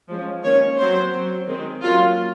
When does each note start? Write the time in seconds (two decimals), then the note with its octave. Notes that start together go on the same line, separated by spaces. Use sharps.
0.08 F3 G#3 C#4
0.42 D#3 A#3 C#4 C#5
0.77 F#3 C4 C5
1.12 F#3 C4
1.47 D#3 G#3 C4
1.82 F#3 A#3 C#4 F4